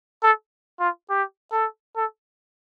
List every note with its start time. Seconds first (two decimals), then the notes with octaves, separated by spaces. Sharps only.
0.23 A4
0.80 F4
1.10 G4
1.52 A4
1.96 A4